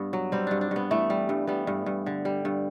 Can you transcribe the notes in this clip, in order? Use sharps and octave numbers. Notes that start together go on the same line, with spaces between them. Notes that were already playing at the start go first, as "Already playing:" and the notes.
Already playing: G2 B3
F#3
G3 C4
G2 D4
D4
G2 B3
E3 A3
G3
G2
G3 B3
G2
G2
D3
G3
G2